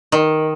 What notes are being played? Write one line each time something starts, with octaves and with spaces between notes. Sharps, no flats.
D#3